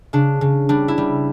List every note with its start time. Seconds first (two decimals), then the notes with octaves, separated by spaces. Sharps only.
0.13 C#3 D4
0.41 C#3
0.69 G3 D4
0.88 E4
0.98 G3